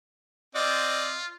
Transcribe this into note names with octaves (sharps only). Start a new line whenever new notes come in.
C4 F4 D5 D#5